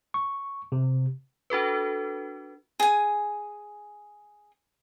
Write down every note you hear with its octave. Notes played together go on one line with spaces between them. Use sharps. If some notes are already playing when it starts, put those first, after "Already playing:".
C#6
C3
D4 F#4 A4 B4
G#4 G#5